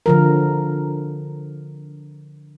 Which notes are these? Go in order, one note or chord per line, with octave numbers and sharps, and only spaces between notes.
D3 F3 A#4